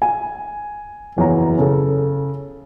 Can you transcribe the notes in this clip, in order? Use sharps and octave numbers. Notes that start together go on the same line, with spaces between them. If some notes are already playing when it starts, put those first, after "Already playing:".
G#5
F#1 E2 C#5 A#5
C#3 A4